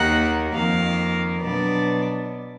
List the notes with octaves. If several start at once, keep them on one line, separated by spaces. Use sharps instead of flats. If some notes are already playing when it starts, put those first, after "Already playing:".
Already playing: D#2 D#3 A#3 D#4 F#5
F2 D#3 A#3 F5
B2 F#3 B3 D4 D5